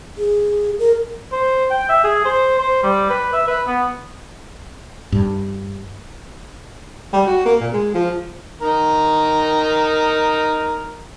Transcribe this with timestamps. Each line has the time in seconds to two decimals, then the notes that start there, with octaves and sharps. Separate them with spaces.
0.18 G#4
0.79 A#4
1.32 C5
1.70 G5
1.89 E5
2.04 G#4
2.25 C5
2.59 C5
2.83 G3
3.10 B4
3.33 E5
3.47 B4
3.67 B3
5.12 G2
7.13 G3
7.27 F#4
7.46 A#3
7.60 A#2
7.73 G#3
7.94 F3
8.61 D#4 A#4